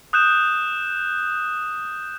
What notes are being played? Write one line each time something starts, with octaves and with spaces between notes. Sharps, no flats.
D#6 F#6 G6 E7